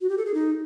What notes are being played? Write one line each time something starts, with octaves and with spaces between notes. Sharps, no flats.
F#4
G4
A4
G#4
D#4